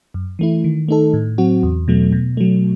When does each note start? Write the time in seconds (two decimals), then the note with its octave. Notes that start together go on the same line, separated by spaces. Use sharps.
0.14 F#2
0.39 E3 A3 E4
0.64 D#3
0.88 A3 D#4 A4
1.14 A2
1.38 F#3 C4 F#4
1.63 E2
1.88 B2 F#3 A3
2.12 B2
2.37 F#3 A3